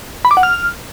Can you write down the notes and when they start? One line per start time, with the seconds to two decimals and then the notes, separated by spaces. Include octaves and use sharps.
0.25 B5
0.31 D6
0.37 F#5
0.43 F6